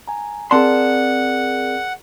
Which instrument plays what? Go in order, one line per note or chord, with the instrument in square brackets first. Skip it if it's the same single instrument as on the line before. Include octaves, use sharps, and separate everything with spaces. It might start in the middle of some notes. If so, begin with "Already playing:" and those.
[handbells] G#5 A#5
[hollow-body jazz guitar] C4 A5 C6 [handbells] G#4 A#4 D5 [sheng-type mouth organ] F#5